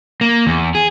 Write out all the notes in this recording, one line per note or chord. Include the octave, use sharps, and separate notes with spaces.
A#3
E2
G#4